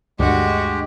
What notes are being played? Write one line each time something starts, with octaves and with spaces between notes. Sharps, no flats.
D2 G2 G#3 F#4 G4